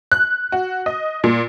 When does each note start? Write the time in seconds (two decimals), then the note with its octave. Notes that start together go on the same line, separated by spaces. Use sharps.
0.12 F#6
0.52 F#4
0.86 D#5
1.24 A#2